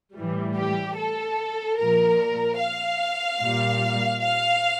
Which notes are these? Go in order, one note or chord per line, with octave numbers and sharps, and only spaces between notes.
A2 E3 G3
G4
A4
A#2 F3 A#4
F5
A#2 G3
F5